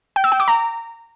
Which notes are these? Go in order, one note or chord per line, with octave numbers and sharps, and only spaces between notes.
G5
E6
G5
D6
A#5